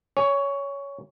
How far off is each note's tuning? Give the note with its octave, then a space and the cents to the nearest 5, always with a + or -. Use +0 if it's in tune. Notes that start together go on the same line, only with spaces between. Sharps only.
C#5 +15 G#5 -10